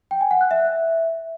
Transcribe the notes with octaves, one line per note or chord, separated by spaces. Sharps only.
G5
G#5
F#5
F#6
E5